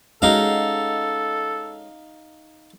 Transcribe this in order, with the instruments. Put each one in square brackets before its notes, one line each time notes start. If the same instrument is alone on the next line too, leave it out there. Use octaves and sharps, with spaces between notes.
[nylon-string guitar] G#3 C#4 F#4 [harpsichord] D#4 F5 [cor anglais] A4